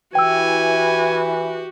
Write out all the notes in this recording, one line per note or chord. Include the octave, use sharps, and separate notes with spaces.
E3 F#4 G4 G5 G#5 E6